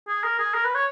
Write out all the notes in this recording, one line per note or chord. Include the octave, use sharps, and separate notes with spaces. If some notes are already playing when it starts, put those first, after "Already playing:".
G#4
A#4
G#4
A#4
B4
C#5